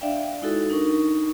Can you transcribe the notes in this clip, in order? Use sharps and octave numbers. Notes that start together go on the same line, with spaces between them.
D4 D5 E5 F5 G5
G#3 D#4 E4 F#4 A4
D4 D#4 A#4 C#6